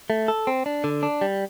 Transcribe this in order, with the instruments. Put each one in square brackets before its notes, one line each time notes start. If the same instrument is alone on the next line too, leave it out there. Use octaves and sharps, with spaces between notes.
[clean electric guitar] A3
A4
C4
D4
D3
D4
G3